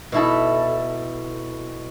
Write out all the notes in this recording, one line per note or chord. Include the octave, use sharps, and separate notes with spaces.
B2 E4 A4